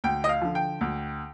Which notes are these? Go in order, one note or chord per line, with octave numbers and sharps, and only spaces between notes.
D2 G5
D#5
F5
D3 F3
G5
D2